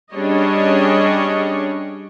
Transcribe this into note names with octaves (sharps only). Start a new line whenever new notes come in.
G3 C#4 D4 G#4 C#5 D#5